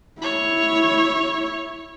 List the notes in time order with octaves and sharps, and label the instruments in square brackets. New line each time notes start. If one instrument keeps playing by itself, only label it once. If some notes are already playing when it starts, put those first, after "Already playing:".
[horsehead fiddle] E4 [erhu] C#5